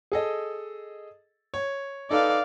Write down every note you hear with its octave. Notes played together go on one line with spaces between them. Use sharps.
G#4 A4 D#5
C#5
D#4 A4 B4 D5 F5